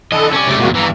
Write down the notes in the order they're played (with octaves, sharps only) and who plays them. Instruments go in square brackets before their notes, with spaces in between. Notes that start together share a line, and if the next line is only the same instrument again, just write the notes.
[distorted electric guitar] D3 E3 [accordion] A4 [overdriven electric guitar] D#5
[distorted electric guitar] C3 D5 [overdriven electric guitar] C#4
[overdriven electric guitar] C#3 A3 [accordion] G3 D6
[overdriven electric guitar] E2 A#2 [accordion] G#3 A#3 F#4
[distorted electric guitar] E2 G2 [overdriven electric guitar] E3 [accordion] A#5